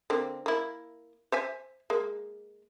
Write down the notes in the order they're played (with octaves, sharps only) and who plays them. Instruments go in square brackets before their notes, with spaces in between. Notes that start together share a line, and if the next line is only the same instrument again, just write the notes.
[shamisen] D3 A#3 C4
A#3 E4
C5 E5 G#5
G#3 A#3